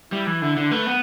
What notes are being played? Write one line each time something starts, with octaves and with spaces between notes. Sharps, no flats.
G3 E4
E3
D3 E4
D3
A3 B4
B3